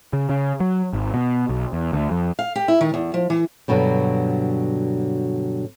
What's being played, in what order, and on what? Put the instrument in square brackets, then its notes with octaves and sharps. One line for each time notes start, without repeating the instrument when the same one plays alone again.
[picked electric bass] C#3
C#3
F#3
G#1
B2
B1
E2
D2
F2
[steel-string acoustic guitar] F5
G4
E4
D#3
E2
F3
E3
[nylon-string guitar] G2 B2 D3 F#3